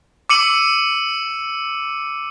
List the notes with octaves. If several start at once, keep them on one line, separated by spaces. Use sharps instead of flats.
D6 E6 C#7 D#7 F#7